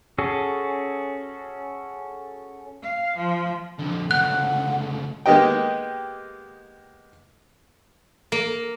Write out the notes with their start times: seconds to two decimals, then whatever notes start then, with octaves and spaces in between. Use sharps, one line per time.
0.18 C#4 F#4 G#4 A4
2.83 F5
3.16 F3
3.79 F2 D3
4.11 D2 C#3 F#5 F#6
5.26 G#3 A#3 B3 G4 D#5 G5
8.32 A#3